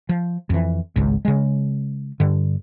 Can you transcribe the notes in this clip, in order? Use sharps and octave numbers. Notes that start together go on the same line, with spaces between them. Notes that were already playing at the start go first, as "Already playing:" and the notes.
F3
F2 E3
G#1 C#2 G#2
C#3 G#3
G2 D3